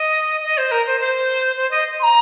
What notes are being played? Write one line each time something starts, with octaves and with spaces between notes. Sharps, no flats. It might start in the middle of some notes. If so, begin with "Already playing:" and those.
Already playing: D#5
D#5
C5
A#4
C5
C5
C5
D#5
C6
A#5